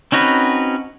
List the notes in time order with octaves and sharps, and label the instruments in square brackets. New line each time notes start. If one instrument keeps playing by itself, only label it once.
[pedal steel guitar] C4 C#4 D#4 F#4 B4